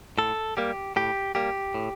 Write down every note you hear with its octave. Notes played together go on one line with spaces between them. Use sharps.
A2 A4
G3 A#3 G4
A2 G4
G3 A#3 G4
A2